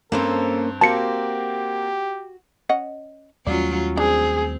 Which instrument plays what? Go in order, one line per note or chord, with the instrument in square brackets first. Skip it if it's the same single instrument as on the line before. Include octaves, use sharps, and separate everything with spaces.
[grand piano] G2 C4 [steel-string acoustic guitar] A#3 C#4 C5 [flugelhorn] A4
[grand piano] A#3 C4 [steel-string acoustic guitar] F#4 [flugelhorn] G4 [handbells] A5 C#7
[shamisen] C#4 D#5 F#5
[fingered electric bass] D#2 G3 A3 [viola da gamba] F#3 C#4 F4 [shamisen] D5
[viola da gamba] C4 [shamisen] D4 [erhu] G#4